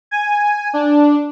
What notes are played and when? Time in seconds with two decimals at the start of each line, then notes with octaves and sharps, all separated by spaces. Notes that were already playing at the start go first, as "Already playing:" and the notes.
0.11 G#5
0.73 D4